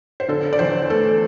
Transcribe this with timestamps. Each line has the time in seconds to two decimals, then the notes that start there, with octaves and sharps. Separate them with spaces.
0.20 C5
0.28 D3 A4
0.53 D5
0.59 E2 C5
0.89 A3 A4